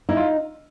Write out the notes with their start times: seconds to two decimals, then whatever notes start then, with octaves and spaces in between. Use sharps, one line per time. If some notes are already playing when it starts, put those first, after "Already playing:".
0.09 D#4 E4
0.17 F4